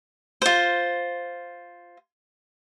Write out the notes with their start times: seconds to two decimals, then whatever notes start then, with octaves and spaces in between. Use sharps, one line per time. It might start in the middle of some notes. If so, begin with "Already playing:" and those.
0.42 F4 C5